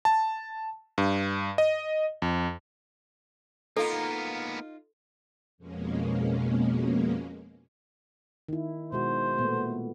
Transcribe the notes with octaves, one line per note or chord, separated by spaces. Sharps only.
A5
G2
D#5
F2
A#3 B3 D#4 F4 A4
F2 B2 G#3 A#3 C#4
D#3 E4
B2 G#3 F#4 C5
A#2 A3 B3